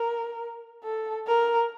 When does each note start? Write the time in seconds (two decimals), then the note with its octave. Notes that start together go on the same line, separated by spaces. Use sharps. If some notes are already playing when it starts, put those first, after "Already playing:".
Already playing: A#4
0.84 A4
1.27 A#4